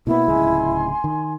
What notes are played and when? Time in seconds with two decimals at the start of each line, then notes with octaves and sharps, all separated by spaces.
0.07 B2 A#3 B3 E4
0.28 D1 C#2 G#3 G#5 C6
1.04 D#3